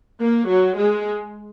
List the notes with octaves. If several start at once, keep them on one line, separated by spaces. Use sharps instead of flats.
A#3
F#3
G#3